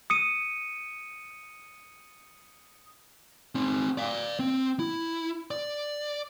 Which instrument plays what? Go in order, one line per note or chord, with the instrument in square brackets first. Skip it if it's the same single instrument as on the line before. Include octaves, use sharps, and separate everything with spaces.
[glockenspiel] D#6 C#7 D#7
[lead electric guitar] C4 D#4
D5 F5
C4
E4
D5